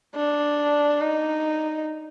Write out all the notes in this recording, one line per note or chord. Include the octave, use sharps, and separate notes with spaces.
D4
D#4